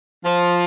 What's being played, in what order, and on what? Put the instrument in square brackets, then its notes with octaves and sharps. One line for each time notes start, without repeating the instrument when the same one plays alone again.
[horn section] F3